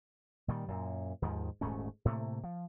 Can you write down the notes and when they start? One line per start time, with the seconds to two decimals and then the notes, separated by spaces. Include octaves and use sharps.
0.48 A#2 D#3 G3
0.68 F#2 A#2
1.22 D#2 G#2 D#3 F3
1.61 D#1 G#2 A3 C#4
2.05 A2 C3 A3 A#3
2.44 F3